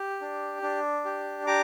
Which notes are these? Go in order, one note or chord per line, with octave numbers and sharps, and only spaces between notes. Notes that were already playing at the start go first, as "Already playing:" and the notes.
Already playing: G4
D4
D4
G4
G4 A#5 D6